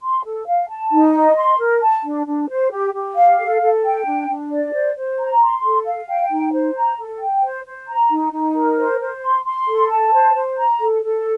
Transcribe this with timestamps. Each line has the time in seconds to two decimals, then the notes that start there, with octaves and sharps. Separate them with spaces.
0.02 C6
0.24 A4
0.47 F5
0.69 A5
0.92 D#4
1.14 D#5
1.37 C6
1.59 A#4
1.82 A5
2.04 D4
2.27 D4
2.50 C5
2.72 G4
2.94 G4
3.16 F5
3.39 A4
3.61 A4
3.84 G5
4.06 D4
4.29 D4
4.51 D5
4.73 C5
4.96 C5
5.19 A#5
5.41 C6
5.63 A4
5.86 F5
6.08 G5
6.31 D#4
6.53 C5
6.75 A#5
6.98 A4
7.20 G5
7.43 C5
7.65 C5
7.88 A#5
8.10 D#4
8.33 D#4
8.55 A#4
8.78 C5
9.00 C5
9.22 C6
9.45 C6
9.67 A4
9.90 A5
10.13 C5
10.34 C5
10.57 A#5
10.79 A4
11.02 A4